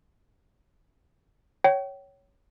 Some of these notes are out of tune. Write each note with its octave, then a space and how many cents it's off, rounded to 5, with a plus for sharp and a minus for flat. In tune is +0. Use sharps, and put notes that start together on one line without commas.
C#5 +5 G5 -35